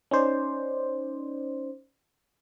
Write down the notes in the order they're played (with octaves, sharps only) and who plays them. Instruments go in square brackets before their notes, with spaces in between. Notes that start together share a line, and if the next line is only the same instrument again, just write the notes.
[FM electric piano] C#4 D#4 C5 D5